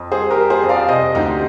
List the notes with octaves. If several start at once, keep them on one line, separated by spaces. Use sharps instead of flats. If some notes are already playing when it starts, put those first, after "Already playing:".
Already playing: F2
G3 G#4 C5
G4 A#4
G3
G#4 C5
F2
D5 F5
C3 C5 D#5
D2 D#4 G4